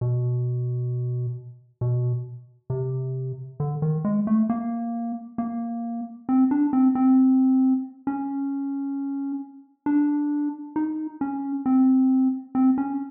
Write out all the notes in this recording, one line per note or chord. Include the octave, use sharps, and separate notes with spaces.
B2
B2
C3
D3
D#3
G#3
A3
A#3
A#3
C4
D4
C4
C4
C#4
D4
D#4
C#4
C4
C4
C#4